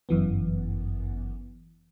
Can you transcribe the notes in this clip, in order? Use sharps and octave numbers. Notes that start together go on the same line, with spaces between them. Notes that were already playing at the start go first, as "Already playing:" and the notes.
G1 F#2 E3 B3